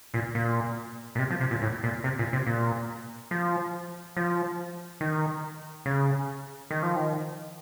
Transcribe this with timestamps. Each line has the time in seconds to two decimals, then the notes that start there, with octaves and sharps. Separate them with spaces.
0.14 A#2
0.35 A#2
1.15 A#2
1.19 C3
1.31 F3
1.41 C3
1.51 A#2
1.62 A2
1.83 A#2
2.04 C3
2.19 A#2
2.33 C3
2.46 A#2
3.31 F3
4.17 F3
5.01 D#3
5.86 C#3
6.71 D#3
6.83 F3
6.96 D#3